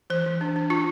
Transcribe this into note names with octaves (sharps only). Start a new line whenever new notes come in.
E3 C5
E3
D4
D4
D4 F4